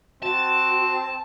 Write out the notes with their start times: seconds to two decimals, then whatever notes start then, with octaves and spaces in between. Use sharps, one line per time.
0.23 C4 F#4 A5